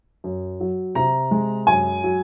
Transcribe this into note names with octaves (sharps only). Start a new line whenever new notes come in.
F#2
F#3
C3 A#5
G#3
F#2 G#5
F#3